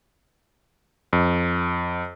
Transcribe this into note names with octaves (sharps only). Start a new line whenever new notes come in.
F2